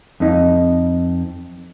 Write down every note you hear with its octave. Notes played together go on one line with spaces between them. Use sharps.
F2 D#4